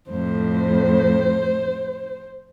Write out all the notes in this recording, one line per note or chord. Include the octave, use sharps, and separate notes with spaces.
F2 A2 C5